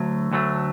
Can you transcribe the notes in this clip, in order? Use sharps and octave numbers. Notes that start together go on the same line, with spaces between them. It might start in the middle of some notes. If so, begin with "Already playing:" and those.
Already playing: D2 D3 F#3 A3
D2 D3 F#3 A3